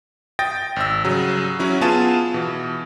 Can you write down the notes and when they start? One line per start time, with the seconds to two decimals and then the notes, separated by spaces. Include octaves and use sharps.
0.39 G5 D#6 A6 A#6
0.76 G#1 E6
1.04 C#3 F#3 G3
1.59 F#3 C#4 E4
1.81 B3 F4 G#4 G#5 A5
2.34 B2 E3